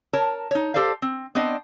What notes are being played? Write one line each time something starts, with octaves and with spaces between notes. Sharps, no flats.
A#4 C#5 A5
D#4 C#5
G4 A4 C5 D5 F5
C4
B3 C4 D4 D#5